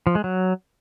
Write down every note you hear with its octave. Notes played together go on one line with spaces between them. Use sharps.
F3
G#3
F#3